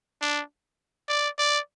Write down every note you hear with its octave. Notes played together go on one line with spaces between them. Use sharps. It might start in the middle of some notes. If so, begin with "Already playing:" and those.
D4
D5
D5